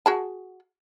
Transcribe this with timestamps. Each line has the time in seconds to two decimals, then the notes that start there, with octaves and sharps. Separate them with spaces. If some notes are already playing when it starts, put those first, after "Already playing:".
0.06 F#4 G#4 A5